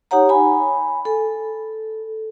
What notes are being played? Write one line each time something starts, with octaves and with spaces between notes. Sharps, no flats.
D#4 G4 C#5 F#5 A#5
G#5 B5
A4